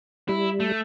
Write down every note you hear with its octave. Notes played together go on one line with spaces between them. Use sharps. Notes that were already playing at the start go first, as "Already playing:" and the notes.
G3 E4
A3